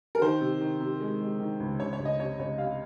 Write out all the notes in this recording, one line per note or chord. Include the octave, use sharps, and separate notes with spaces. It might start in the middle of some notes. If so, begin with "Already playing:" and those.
A#4
D#3 C5
C3
D#3
C3
G#3
G#3
D#3
C#2
C#2 C#5
C#5
C#2
D#5
C3 C#5
C#2 C#5
C3 F5